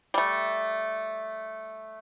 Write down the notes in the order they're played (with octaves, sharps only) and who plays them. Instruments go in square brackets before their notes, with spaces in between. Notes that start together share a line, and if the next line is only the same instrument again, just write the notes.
[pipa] G3 A3